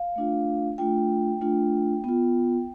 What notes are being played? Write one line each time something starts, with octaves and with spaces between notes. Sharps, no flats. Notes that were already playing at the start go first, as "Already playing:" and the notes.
Already playing: F5
A3 D4 F4
A3 D4 F4 G5
A3 D4 F4
B3 F4